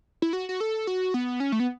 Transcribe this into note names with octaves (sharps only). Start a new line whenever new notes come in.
E4
F#4
F#4
A4
F#4
B3
C#4
A3
B3